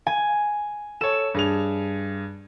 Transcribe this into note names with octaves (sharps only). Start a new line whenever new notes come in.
G#5
A4 C#5 E7
G2 G#4 F7